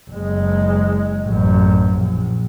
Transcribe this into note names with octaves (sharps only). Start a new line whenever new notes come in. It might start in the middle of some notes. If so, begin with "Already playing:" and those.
F#1 G#3
A1 F#2
A#1